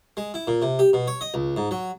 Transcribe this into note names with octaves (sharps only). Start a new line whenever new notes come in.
G#3
E4
A#2
C3
G4
B2
C#5
D#5
C#2
G#2
F#3